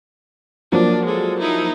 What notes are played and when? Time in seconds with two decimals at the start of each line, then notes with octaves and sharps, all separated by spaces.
0.72 F3 F#3 A#3 D4
1.05 G#3 A4
1.39 D#4 E4